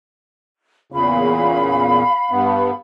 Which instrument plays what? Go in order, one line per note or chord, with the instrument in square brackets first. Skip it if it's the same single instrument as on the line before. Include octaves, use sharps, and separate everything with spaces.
[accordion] E2 A#2 C#3 [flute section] F5 B5
[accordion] G2 B3